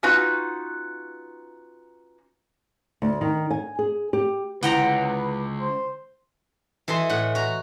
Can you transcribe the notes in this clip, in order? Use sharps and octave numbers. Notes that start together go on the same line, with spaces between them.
C#4 D#4 F4 F#4 B4
D2
D#3
G#5
G#4
G4
C#2 D3 E4 B4 F#5 G5 A#5
C5
E3 A4 D#5 E5 C6
A2 F#5
F#4 A#5